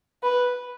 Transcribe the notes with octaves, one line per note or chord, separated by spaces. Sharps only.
B4